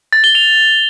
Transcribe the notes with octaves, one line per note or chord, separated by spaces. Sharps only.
A6
G7
F7